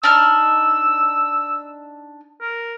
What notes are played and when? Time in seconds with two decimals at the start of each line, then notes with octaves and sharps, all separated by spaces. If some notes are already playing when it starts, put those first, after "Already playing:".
0.03 D4 D#4 E6 F6
2.41 A#4